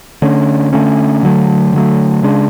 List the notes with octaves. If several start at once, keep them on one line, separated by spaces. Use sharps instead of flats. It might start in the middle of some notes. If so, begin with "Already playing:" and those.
D3 A3 C#4
D3 A3 C#4
D3 F#3 A3
D3 F#3 A3
C#3 G#3 D4